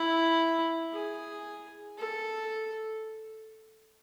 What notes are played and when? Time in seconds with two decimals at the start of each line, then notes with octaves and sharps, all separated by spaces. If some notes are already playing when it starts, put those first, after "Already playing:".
Already playing: E4
0.93 G#4
1.99 A4